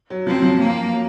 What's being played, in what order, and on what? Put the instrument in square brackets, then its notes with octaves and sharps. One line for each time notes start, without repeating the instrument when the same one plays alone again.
[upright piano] F#3
[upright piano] F3 [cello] C4
[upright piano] F#3
F3
[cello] A#3
[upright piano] F#3